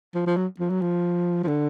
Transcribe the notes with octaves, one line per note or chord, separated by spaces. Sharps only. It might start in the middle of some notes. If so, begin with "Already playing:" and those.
F3
F3
F#3
F3
F#3
F3
F3
D3